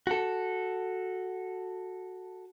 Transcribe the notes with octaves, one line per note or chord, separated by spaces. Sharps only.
F#4 A4